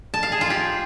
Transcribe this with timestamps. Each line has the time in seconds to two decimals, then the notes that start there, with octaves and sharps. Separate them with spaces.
0.14 A5
0.23 F5
0.32 G#4
0.41 F4
0.50 G4